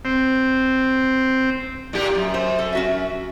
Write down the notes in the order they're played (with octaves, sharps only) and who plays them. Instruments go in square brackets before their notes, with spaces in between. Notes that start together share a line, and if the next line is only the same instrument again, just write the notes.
[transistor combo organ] C4
[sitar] A#2 G4
F#2
[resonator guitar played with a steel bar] C5
A4
C#4 F#4 E5